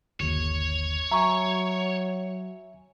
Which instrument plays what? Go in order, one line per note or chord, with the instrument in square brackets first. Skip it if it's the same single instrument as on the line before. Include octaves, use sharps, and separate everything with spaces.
[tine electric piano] G1 D#2 [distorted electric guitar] C#5
[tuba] F#3 [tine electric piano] E5 G#5 [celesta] A#5 C#6